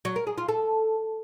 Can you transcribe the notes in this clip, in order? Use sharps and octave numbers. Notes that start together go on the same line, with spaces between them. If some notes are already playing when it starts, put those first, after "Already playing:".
F#3
A#4
G#4
F4
A4